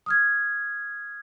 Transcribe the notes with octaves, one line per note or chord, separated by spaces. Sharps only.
D#6 F6 G#6